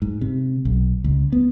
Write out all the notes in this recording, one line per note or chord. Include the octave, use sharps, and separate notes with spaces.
G#2
C3
B1
C#2
B3